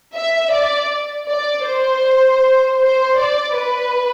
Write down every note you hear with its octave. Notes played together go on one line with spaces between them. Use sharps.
E5
D5
D5
C5
C5
D5
B4